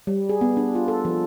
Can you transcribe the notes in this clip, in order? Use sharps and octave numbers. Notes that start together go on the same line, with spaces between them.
G3
G#4
B3
D4
F4
A4
F3